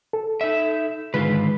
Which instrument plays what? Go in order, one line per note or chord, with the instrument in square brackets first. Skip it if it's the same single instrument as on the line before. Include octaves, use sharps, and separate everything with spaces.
[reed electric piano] A4
[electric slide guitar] D#4 E5
[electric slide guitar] G#2 F4 B4 [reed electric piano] D3 D#3 G#3